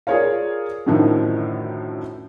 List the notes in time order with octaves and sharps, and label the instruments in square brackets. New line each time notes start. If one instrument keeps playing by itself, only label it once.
[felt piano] F4 G#4 A#4 C#5 D5 F5
F#2 A2 D3 D#3 F3